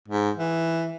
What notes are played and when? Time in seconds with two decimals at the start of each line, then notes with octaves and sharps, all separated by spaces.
0.08 G#2
0.37 E3